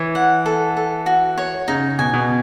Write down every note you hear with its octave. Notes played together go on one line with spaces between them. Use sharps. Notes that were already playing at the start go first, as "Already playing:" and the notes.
Already playing: E3 C#5
F#5
A4
A4
F#4
C#5
C#3 D#4
B2 G#5
B2